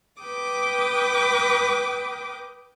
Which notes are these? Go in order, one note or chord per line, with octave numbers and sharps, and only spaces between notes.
B4 G5 D6 D#6